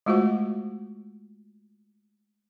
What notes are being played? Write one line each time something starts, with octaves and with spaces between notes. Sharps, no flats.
G#3 A3 F4 F#4 C5 F#5